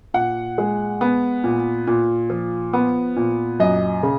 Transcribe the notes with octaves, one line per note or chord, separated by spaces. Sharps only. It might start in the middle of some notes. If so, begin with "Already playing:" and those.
A#2 F#5
G#3
B3
A#2
A#2
F3
B3
A#2
F#2 D#5
C#3